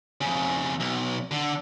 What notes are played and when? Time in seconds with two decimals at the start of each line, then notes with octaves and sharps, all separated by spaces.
0.21 F2 C#3
0.80 B1
1.31 D3